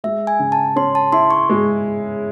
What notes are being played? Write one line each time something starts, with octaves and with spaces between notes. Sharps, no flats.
G#3 E5
G#5
C#3
A5
C#4 C6
A5
E4 C6
C#6
G#3